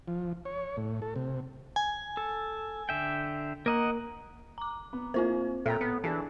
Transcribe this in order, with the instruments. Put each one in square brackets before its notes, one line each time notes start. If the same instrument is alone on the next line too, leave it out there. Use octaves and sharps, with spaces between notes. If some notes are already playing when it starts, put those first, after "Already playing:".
[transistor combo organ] F3
C#5
A2
A4
C3
[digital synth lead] G#5
[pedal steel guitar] A4
D3 E5 G5
[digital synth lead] A#3 [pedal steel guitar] A#4 D#5 F#5
[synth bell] A#5 D6
[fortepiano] B3
[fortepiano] A#3 [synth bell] C4 F4 C5
[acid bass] A#2 [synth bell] A4 [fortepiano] E5 G5 A#5
[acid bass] B3
[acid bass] E3 [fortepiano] D4 G#4 A5